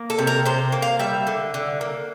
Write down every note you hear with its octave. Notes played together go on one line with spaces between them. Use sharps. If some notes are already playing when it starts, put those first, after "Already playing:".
Already playing: A#3
A4
C3
A#4
C3 C5
A#3
F5
G3 E5
D3
D3
A#3